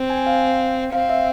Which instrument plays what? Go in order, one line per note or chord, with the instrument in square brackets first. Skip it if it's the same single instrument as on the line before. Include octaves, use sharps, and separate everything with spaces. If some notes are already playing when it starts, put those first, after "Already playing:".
Already playing: [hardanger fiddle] C4
[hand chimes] G#5
F5
[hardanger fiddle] C4 [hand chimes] F5
[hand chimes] E5